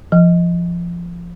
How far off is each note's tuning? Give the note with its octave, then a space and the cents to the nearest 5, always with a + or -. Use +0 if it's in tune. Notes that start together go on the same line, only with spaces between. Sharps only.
F3 -20